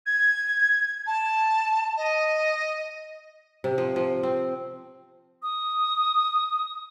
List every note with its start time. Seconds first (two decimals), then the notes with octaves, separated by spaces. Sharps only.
0.07 G#6
1.07 A5
1.97 D#5
3.64 C3
3.78 F3
3.96 F3
4.23 C4
5.43 D#6